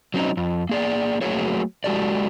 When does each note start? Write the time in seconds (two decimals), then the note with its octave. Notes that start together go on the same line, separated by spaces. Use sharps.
0.14 F#3 C4 C#4 D#4
0.37 F2
0.69 A#3 G#4 D5
1.21 F#3 A3 A#3 F#4 G#4 C#5
1.84 G#3 F#4 G4 A4 D5